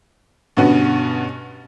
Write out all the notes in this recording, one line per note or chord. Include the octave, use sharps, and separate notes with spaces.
G2 B2 D3 B3 C#4 F#4